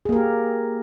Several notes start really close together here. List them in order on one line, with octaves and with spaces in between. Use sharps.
G#4 A#3 A#4 G4